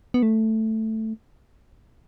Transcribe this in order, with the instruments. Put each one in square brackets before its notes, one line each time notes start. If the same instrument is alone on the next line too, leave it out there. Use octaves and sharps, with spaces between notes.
[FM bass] B3
A3